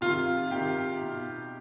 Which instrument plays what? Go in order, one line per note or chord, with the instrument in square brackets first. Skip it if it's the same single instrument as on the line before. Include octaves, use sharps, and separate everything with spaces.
[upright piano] C3 D#3 F4
C3 D#3 G4
B2